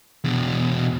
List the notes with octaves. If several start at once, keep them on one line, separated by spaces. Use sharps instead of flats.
E2 B2